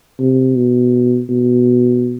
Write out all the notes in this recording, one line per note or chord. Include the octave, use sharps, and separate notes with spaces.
C3
B2
B2